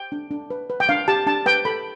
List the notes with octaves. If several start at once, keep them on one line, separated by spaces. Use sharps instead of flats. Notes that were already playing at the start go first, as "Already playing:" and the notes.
Already playing: G5
D4
D4
B4
B4
G5
D4 F5
G4 A5
D4 A5
B4 G5
A4 B5